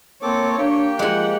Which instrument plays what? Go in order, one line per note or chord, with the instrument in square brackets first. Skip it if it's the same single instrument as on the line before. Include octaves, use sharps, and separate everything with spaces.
[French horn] A#3 [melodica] C4 A4 D6 [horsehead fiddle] C#5
[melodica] A#3 G4 G5 [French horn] D4
[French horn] F3 [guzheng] G#3 G#5 [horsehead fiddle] F#5